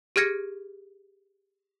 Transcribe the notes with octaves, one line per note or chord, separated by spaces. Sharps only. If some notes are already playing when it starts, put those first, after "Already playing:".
G4 G#4 F6 G#6 A#6 C#7